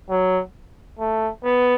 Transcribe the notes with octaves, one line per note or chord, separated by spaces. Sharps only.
F#3
A3
B3